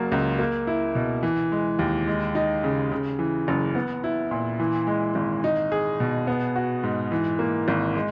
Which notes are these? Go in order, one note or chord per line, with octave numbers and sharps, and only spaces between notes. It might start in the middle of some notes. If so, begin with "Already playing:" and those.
Already playing: F#1 F#3 A#3
C#2
A#3
E4
B2
E3
G#3
D#2
G#3
D#4
C#3
C#3
E3
F#1
B3
E4
A#2
E3
G#3
G#1
D#4
G#4
B2
B3
F#4
G#2
E3
A#3
G#1
G#3